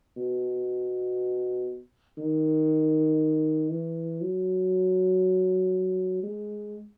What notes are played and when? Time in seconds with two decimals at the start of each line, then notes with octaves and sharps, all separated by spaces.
0.17 B2
2.18 D#3
3.70 E3
4.21 F#3
6.23 G#3